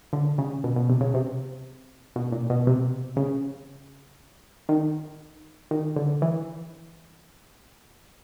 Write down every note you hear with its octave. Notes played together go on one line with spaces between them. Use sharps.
D3
C#3
B2
B2
C3
C#3
C3
B2
A#2
B2
C3
C#3
D#3
D#3
D3
E3